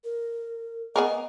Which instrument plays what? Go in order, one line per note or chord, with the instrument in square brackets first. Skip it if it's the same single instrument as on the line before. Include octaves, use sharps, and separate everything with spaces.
[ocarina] A#4
[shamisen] B3 G#4 A#4 [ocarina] D#5